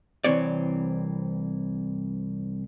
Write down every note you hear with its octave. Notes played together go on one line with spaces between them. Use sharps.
C2 E3 C4 C#5 D5